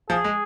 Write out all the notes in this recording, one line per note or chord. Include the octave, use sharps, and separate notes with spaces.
F3 G#4
G#3